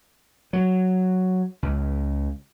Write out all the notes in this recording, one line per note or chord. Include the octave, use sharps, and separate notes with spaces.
F#3
C#2